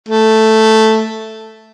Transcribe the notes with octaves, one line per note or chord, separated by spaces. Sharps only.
A3